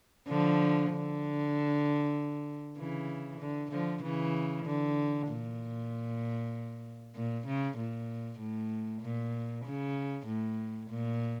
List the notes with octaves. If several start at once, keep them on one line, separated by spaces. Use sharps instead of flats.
D3 F3
D3
C#3 E3
D3
D3 F3
C#3 E3
D3
A#2
A#2
C#3
A#2
A2
A#2
C#3
A2
A#2